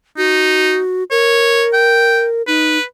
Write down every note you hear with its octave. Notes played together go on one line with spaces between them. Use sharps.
D#4 F#4
A#4 C#5
G5
D#4 B4